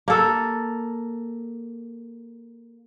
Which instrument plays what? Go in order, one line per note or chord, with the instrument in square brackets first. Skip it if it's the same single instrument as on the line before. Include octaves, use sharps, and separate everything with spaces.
[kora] A#3 A4